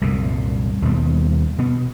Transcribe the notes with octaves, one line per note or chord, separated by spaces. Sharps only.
C2 F#2 A#2
D#2 B2 G3
B2 B3